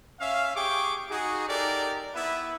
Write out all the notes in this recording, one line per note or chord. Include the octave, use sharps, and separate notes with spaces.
C#4 E5 F5
G4 G#4 G5 C#6 D6
D#4 F#4 G#4
D#4 G4 A4 A#4 D5
B3 E4 B4 E5